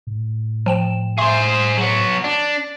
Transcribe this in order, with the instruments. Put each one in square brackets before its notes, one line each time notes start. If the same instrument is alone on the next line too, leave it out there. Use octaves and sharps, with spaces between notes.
[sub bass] A2
[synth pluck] F3 G5 E7
[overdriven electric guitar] G#4 C5 [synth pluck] E5 C6
[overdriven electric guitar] F#3 B3
D4